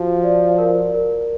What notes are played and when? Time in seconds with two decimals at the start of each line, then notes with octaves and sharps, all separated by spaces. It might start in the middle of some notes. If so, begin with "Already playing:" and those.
Already playing: F3 F#4
0.24 D5
0.58 A#4
0.94 A#4